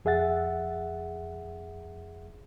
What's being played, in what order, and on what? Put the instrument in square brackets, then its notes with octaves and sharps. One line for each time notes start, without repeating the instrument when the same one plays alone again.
[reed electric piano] F2 G#4 E5 F#5 A6